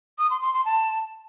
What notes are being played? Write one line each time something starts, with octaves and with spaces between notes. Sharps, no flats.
D#6
C6
C6
C6
A5